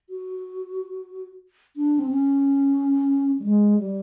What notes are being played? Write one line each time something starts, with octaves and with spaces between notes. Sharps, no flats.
F#4
D4
C4
C#4
G3
G#3
G3